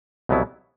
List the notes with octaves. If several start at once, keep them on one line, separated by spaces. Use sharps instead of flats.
C2 B2 F#3 B3 E4